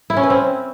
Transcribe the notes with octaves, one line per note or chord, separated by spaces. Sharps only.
E4
C#4
B4
C4